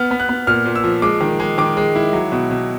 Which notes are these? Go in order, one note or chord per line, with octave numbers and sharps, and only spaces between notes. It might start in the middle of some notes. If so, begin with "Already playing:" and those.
Already playing: B3 F6
B3
F#6
B3
A#2 F6
A#2
E6
F3
G#3 D6
D#3
G#3
D#3 D6
G#3
E4
F#3
B2
B2